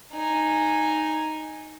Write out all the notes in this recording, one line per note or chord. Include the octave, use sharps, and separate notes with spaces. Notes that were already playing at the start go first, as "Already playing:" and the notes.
D#4 G#5